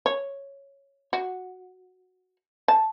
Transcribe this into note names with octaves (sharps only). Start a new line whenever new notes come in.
C#5
F#4
A5